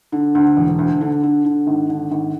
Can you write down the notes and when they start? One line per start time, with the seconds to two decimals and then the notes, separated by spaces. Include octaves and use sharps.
0.12 D3
0.35 D2
0.57 E1
0.79 D2
1.01 D3
1.23 D3
1.45 D3
1.67 G#1
1.89 D3
2.12 G#1